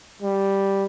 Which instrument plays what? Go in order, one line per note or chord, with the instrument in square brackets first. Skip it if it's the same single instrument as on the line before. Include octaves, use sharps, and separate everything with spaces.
[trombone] G3